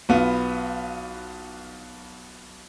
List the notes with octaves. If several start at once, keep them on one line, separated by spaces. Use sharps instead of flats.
B1 B3 F4